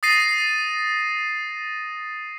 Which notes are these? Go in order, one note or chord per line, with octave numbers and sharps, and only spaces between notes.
D#6 A6 A#6 C7 D#7